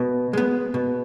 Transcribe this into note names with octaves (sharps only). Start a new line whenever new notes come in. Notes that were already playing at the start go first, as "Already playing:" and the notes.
Already playing: B2
G#3 B3
B2